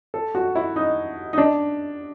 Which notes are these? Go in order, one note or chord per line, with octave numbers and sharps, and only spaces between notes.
A4
F#4
E4
D#4
D#4
D4